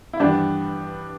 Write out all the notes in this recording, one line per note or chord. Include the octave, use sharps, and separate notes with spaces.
E4
G2 E3 B3 D4 G4